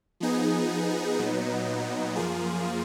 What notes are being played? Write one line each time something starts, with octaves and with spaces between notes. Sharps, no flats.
F3 B3 D#4 G#4
A#2 F#3 B3 D#4
F#2 F3 A#3 F4 G#4